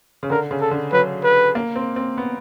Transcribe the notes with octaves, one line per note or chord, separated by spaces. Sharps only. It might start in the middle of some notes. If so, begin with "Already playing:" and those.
C#3
D3 A#4
C#3
A4
D3
F#3 B4
B4
A#3
C4
C4
B3